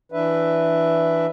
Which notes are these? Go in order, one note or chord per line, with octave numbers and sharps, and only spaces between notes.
E3 D4 B4 E5